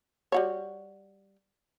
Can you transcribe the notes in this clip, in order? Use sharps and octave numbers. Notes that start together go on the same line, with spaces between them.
G3 F#4 C#5